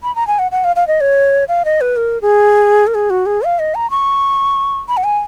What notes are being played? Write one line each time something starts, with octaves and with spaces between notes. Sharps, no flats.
B5
A#5
G#5
F#5
F#5
F5
F5
D#5
C#5
F5
D#5
B4
A#4
G#4
A#4
G#4
F#4
G#4
F5
D#5
A#5
C#6
B5
F#5
G#5